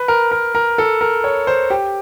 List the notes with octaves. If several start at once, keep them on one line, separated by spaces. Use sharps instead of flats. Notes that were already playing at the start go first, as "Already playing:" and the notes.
Already playing: B4
A#4
A#4
A#4
A4
A#4
C#5
C5
G4